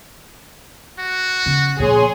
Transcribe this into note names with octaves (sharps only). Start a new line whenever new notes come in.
F#4
C#3
A#2 F3 G#4 C#5 C6